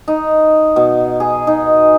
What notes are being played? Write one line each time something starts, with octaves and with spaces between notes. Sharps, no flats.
D#4
B2
G#4
D#4